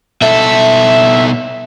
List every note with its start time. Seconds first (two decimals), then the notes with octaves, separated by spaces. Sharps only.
0.22 B2 A4 E5